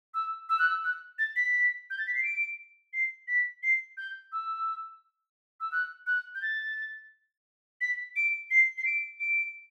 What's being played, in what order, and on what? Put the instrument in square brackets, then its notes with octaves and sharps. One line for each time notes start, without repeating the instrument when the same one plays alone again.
[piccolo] E6
E6
F#6
E6
F#6
A6
B6
G6
A6
B6
C7
D7
C7
B6
C7
G6
E6
E6
F#6
F#6
G6
A6
B6
D7
C7
C7
D7
D7